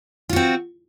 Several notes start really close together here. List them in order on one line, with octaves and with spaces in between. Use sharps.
F4 F#4 C4